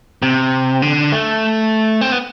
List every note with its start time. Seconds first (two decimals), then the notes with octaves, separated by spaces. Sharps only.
0.22 C3
0.82 D3
1.12 A3
2.01 C4
2.12 B3